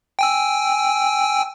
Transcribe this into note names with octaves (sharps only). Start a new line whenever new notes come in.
G5 G#5 E6